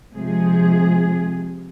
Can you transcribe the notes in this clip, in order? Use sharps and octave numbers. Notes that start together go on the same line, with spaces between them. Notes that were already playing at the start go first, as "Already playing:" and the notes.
C3 F3 G#3 G#4